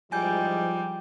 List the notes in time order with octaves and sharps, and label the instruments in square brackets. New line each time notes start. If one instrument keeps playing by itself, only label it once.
[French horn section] G#2 E3 G#3 [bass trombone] F3 [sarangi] G3 [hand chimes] G#5 G6